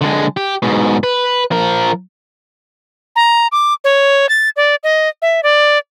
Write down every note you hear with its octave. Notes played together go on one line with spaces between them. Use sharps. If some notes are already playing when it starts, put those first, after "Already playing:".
D3 G#3
G4
G#2 B2
B4
F3 A#4
A#5
D6
C#5
A6
D5
D#5
E5
D5